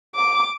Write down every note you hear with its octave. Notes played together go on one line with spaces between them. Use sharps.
D6